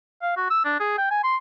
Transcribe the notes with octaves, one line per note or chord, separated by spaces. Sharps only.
F5
F#4
E6
D4
G#4
G5
G#5
C6